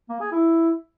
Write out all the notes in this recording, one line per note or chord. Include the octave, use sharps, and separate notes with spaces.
A#3
G#4
E4